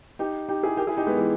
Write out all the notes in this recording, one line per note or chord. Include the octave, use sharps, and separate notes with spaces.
D#4 G4
D#4 G4
E4 G#4
G4 A#4
E4 G#4
D#4 G4
G#3 B3
E3 G#3